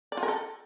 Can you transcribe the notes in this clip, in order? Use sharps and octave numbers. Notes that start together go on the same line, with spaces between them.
D5
F4
A#4
A4